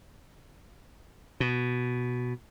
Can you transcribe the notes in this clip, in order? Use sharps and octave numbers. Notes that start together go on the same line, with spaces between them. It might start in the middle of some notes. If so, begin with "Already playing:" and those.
B2